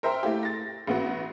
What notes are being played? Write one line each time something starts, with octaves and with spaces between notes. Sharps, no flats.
A#4 C5 E5 G5 A#5 C6
A3 E4 G4
A6 A#6
A1 B3 F#4